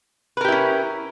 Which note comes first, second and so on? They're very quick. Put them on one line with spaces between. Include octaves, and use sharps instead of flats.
B4 A#4 G4 E4 C#4